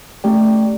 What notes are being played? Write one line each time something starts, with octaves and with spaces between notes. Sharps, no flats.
A3 C#4 G4 D5 G5